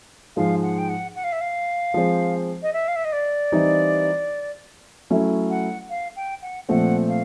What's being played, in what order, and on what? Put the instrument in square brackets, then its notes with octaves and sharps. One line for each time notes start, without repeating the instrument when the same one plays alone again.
[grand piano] G#2 F3 G#3 [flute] F5
[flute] F#5
G5
F#5
F#5
F5
E5
F5
[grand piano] F3 G#3 C4
[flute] D#5
E5
F5
E5
D#5
D5
[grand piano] E3 G3 C4 D#4
F#3 A3 C#4 E4 A4
[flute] F#5
F5
G5
F#5
[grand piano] A#2 F3 A3 C4 [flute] F#5
[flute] F5